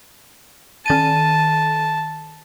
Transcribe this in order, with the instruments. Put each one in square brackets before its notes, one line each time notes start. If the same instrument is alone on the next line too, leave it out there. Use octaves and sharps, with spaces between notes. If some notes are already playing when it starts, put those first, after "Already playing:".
[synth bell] D#3 A6 D#7 [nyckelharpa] A5